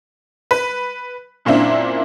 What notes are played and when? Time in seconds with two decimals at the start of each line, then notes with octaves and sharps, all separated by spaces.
0.51 B4
1.45 F#2 A#2 A#3 C4 D4 E4